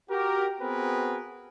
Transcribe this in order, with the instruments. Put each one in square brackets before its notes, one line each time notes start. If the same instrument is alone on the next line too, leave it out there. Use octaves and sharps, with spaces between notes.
[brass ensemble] F#4 G4 A#4
B3 C4 F#4 G#4 A#4 B4